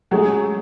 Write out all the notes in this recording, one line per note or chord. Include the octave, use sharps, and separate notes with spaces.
F#3 G#3 A3 C#4 G#4